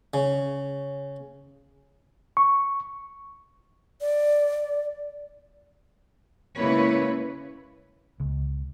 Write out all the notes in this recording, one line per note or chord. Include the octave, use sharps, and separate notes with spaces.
C#3
C#6
D5
C#3 G#3 A#3 E4 B4 C#5
C#2